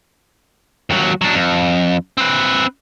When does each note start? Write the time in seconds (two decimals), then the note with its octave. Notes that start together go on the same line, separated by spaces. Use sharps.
0.90 D#2 F#3
1.21 F#3 D4
1.34 F2
2.17 C4 B4